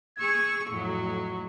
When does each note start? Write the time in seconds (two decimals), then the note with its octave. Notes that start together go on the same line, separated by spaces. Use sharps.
0.17 G#4 C#6 E6 G#6
0.70 F2 A2 F#3 C#6